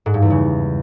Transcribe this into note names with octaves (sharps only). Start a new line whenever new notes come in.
G#2
G2
E2
C#3